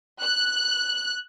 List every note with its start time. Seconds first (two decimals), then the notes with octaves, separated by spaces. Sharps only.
0.22 F#6